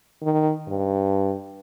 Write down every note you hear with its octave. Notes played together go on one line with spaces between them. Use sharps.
D#3
G2